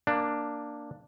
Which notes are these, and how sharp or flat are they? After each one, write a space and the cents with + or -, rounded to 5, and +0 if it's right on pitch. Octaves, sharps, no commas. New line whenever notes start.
A#3 +0 D4 +5